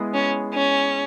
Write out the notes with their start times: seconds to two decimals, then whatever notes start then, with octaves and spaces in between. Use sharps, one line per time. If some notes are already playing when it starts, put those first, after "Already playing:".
Already playing: G#3 B3 E4 G#4
0.14 C#4
0.54 C#4